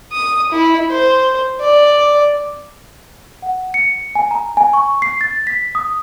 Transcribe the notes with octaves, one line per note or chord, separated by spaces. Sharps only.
D#6
E4
C5
D5
F#5
C#7
G#5
A#5
G#5
C#6
C7
A6
B6
D#6